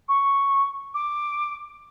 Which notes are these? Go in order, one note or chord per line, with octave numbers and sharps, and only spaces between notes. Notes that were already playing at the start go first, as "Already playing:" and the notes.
C#6
D6